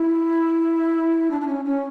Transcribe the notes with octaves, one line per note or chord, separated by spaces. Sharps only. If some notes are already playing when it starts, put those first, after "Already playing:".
Already playing: E4
D4
D4
C#4
C#4